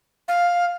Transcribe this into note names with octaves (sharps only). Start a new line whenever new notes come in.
F5